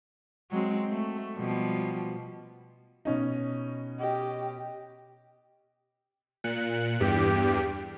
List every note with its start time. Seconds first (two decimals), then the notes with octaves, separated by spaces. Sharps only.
0.51 F#3 G#3 C4
0.90 A3
1.35 B2 F3 G3
3.05 B2 C#4 D#4
4.00 G4 D#5
6.44 A#2 F#6 C#7
7.00 E2 G2 G4